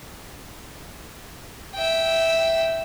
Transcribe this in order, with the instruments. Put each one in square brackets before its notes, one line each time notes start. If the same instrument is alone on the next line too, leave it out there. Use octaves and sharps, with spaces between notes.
[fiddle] E5 G5